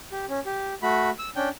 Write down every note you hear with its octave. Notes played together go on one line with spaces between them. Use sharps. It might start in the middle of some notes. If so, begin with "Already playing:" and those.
G4
C#4
G4
A3 F#4 B5
E6
C#4 D4 G5